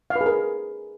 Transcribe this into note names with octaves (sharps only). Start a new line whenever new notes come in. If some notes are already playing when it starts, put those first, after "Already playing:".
F5
B4
G#4
A#4